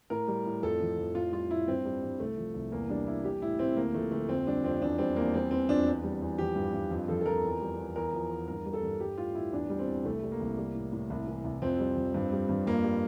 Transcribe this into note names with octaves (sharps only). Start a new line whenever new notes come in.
A2 A#4
G3
A2
F2 A4
F3
F2
A2 F4
G3 F4
A2 E4
G2 C4
G3
G2
C2 A3
F3
C2
E2 A#3
G3 D4
E2 E4
G3 G4
A2 E4
A2 C4
D2 A#3
F3 A3
D2 A3
F2 C4
G3 D4
F2 C4
E2 D4
G3 C4
E2 A#3
G3 C4
E3 C4
F2 D4
E2
G3
E2
F3 G4
G2
G2
F2
F3 A4
A4
F2 A#4
E2
G3
E2
E2 A#4
F3
E2
G2 A#4
G3
A4
G2
G3 G4
A2 F4
A2 E4
E2 D4
G3
C4
E2
C2 A3
G3
A#3
C2
G3
A2
A2
C2
E3
C2
F2 C4
G3
F2
G2
G3
G2
F2 A#3
G3